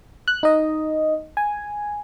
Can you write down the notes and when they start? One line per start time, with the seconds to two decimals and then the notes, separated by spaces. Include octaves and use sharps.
0.28 F#6
0.43 D#4 D#5
1.37 G#5